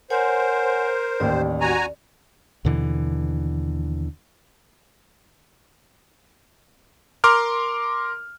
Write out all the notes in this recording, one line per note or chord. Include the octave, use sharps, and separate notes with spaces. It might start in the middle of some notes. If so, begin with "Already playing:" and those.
A#4 C5 C#5 F#5 G#5
A1 D#2 D5
F#4 G#5 A#5
D#2 B2 D3 E3
A#4 C6 D6 F6